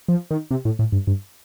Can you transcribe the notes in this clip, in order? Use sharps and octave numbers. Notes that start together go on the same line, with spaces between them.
F3
D#3
C3
A2
A2
G2
G2